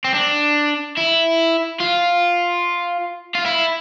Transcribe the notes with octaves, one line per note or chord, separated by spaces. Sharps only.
C4
D4
E4
F4
F4
E4